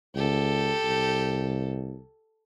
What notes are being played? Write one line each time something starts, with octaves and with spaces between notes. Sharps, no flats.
C#2 G4 A4
C2